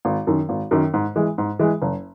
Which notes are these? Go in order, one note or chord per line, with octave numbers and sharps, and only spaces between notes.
G#1
F#2 D#3
G#1
F#2 D#3
G#2
E3 G#3
G#2
E3 G#3
F#1